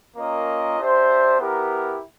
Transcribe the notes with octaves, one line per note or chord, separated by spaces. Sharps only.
A#3 C#4 F4 A#4 D#5
D4 G4 C5 E5
B3 E4 G4 A#4